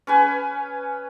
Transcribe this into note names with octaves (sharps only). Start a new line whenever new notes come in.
C#4 B4 G#5